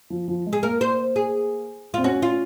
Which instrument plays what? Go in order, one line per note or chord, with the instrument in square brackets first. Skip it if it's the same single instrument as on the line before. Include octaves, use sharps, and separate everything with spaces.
[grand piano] F3
F3
G#3
[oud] G#4
[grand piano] A#3 [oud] A#4
[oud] C5
G#4
[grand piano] C4 [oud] F4
[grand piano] C#4 [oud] F#4
[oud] F4